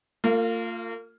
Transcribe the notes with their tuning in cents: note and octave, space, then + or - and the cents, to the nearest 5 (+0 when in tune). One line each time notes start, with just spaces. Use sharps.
A#3 -40 F4 +0